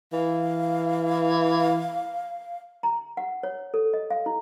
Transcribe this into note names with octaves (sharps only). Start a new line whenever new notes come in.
E3 F5
A#5
F#5
C#5
A4
D#5
F5
E4